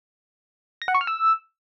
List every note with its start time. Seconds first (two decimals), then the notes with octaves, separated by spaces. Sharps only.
0.82 A#6
0.88 F#5
0.94 C#6
1.01 F6
1.07 E6